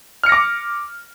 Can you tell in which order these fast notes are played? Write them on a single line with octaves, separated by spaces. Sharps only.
F6 C#7 A#6 D6